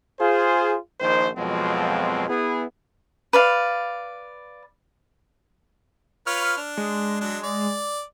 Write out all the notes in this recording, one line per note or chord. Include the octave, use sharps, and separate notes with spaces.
F4 G#4 C5
A#1 D#3 C5
F2 B2 F3 F#3 G#3 C4
B3 E4 G#4
B4 D5 F5
F4 B4 C#5 F6
D4
G#3
F#3 D4
D5